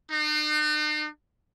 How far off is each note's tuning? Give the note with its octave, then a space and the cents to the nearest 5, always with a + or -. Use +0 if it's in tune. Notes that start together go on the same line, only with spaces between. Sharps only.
D#4 -45